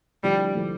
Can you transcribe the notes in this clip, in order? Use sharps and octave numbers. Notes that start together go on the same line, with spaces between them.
D3 F3 G3 A3 E4
D3 F3 A3 E4